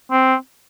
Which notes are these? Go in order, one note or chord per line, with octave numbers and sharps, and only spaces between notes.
C4